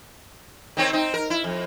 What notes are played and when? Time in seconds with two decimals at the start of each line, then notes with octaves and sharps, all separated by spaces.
0.77 D#3 C4 C#5
0.93 C4 D#4
1.14 A#4
1.30 E4
1.44 F2